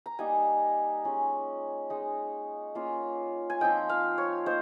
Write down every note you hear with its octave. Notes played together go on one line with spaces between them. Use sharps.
A#5
G3 A#3 D#4 G#5
G#3 C#4 F4
G#3 D#4
A#3 C#4 F4
G#5
F3 C4 D#4 G5
F5
C#5
A#3 D#4 C5